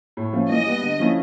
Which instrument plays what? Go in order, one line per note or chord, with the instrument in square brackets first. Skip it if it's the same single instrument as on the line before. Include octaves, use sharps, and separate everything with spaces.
[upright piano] A2
F3 A3 C#4
[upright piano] E3 [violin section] D#5
[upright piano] G3 B3
D3
F3 A3 C#4 E4